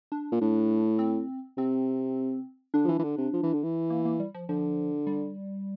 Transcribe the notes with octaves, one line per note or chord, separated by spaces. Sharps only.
D4
A#2
A2 D4
C4
C3 C4
D3 D4
F3
E3
E3
D3
C3
F3
E3
D3
E3
A#3
A#3
G3
F3
D3 F3
G3